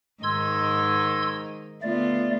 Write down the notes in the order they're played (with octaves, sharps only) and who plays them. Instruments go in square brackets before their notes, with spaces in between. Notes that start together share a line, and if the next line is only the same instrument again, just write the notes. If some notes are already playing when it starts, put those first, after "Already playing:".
[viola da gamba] G#2 D#3 D#5 [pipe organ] C6 E6 G#6
[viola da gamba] D3 B3 F4 [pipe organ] A3 D5